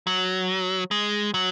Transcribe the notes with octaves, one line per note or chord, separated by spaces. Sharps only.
F#3
G#3
F#3